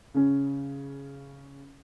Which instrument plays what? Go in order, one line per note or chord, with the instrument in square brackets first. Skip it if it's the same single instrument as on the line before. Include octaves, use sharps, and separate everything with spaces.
[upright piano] C#3 C#4